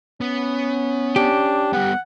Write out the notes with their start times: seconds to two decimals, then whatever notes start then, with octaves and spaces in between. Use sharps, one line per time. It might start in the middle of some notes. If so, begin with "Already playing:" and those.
0.21 B3 C#4
1.16 D4 G4
1.73 G3 B3 F#5